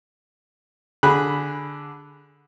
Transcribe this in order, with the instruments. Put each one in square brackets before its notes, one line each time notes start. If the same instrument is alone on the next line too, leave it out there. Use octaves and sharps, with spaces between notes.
[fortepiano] D3 G#4 B5 F#6